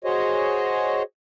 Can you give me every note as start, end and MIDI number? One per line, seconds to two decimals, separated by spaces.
0.04 1.03 66
0.04 1.03 68
0.04 1.03 72
0.04 1.03 73
0.04 1.03 75